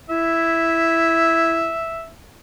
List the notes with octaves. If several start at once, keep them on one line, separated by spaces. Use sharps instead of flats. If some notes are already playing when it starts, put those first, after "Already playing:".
E4 E5